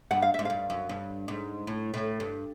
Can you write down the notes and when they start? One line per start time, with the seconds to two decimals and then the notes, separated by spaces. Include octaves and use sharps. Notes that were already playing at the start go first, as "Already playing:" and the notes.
0.11 G2 F#5
0.22 F5
0.34 G#2 E5
0.45 G2 F5
0.70 F#2
0.89 G2
1.28 G#2
1.67 A2
1.94 A2
2.20 G2